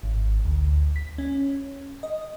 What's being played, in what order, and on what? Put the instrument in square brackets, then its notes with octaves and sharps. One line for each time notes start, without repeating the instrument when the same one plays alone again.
[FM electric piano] G#1
D2
B6
C#4
D#5